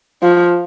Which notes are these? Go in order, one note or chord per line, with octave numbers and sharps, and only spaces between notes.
F3